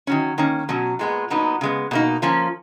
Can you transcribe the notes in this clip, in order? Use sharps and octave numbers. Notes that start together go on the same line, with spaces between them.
D#3 F#3 C#4
D#3 A#3 C#4
B2 F#3 C#4
A#2 G#3 B3
A#2 F#3 B3 D#4
C#3 G#3 B3
B2 A#3 D#4
F3 A#3 C#4